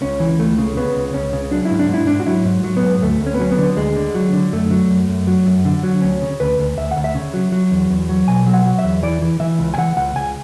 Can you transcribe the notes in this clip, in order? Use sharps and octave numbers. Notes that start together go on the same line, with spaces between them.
C#2 C#4
E3
C#2 A3
C#3
C#3 B3
C#2
C#2 C#4
C#3
F#3 D4
E4
G#2
D4
G#2 E4
G#2 D4
F#4
F#3 E4
G#2
F#3
B3
G#2
D2 A3
D2
C#4
B3
F#3 C#4
B3
D3
D2 G#3
D3
F#3
D3
F#2 A3
F#3
F#2
F#2
F#3
F#2
D3
F#3
D2 C#4
C#3
D2 B4
D2
D2 E5
F#5
D2
E5
C#3
F#3
F#3
E2
E2
F#3
B2 G#5
F#3
F#5
F#3
E5
E2
E3 D5
E3
E3 E5
C#2
G#5
E3 F#5
C#2 F#5
C#2 G#5